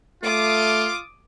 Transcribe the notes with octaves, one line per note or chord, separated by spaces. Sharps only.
A3 F4 D6 D#6